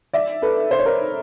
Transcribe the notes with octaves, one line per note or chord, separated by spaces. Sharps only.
D5 E5
A4 B4
C5
C#5
A#4 C5